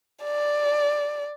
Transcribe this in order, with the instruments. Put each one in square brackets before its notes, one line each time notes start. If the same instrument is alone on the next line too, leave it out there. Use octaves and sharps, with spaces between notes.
[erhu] D5